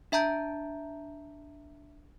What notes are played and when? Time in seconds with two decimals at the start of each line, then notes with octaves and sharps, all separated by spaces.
0.12 D4 E5 A5 A#5 G6